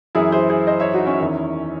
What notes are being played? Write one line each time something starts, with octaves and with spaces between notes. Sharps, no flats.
F#2 E3 E4 G#4
G#4 C5
G#4 C5
C5 D#5
C#5 E5
D#4 F#4
C#4 E4
E2 D#3